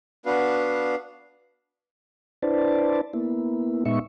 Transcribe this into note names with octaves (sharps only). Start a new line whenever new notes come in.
B3 D4 F#4 B4 F5
D4 E4 B4 C5 D5 A5
A#3 B3 E4
A#2 G#3 B3 D#4 E5 C#6